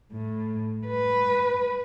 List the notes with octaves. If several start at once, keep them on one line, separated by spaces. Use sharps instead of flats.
A2
B4